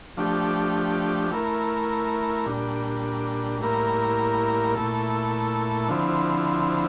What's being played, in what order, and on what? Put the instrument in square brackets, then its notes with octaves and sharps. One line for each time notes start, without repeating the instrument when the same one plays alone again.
[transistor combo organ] F3 A3 D4 G4
A3 E4 A#4
A#2 G3 D4
A2 G3 A#3 E4 A#4
A#2 A3 E4 A4
D3 F3 C4 E4